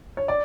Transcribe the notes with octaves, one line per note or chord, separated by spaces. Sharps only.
C#5
D5